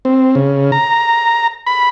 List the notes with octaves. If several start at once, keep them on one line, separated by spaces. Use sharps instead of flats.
C4
C#3
A#5
B5